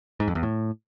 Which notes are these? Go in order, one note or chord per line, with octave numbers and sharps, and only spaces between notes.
G#2
F2
E2
A2